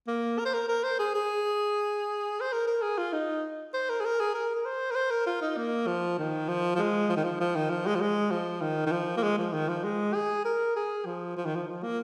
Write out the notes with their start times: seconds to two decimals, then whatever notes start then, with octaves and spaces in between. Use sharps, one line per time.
0.07 A#3
0.38 A#4
0.45 C5
0.53 A#4
0.68 A#4
0.83 C5
0.99 G#4
1.14 G#4
2.40 C5
2.52 A#4
2.67 A#4
2.82 G#4
2.98 F4
3.12 D#4
3.73 C5
3.89 A#4
4.00 G#4
4.05 A#4
4.20 G#4
4.34 A#4
4.55 A#4
4.65 C5
4.91 A#4
4.95 C5
5.10 A#4
5.26 F4
5.42 D#4
5.57 A#3
5.87 F3
6.18 D#3
6.48 F3
6.75 F3
6.79 G#3
7.09 F3
7.16 D#3
7.24 F3
7.40 F3
7.56 D#3
7.70 F3
7.86 G#3
7.95 F3
8.01 G#3
8.31 F3
8.61 D#3
8.86 D#3
8.92 F3
9.17 A#3
9.23 G#3
9.38 F3
9.53 D#3
9.68 F3
9.84 G#3
10.14 G#4
10.44 A#4
10.76 G#4
11.05 F3
11.37 F3
11.45 D#3
11.55 F3
11.67 F3
11.83 A#3